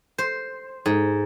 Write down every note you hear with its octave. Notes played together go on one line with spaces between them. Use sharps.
C5
G#2